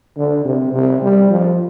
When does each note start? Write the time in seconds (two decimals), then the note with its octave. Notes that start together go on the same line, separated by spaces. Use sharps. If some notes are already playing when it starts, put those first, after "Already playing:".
0.17 D3
0.45 C3
0.73 C3
1.02 G3
1.30 F3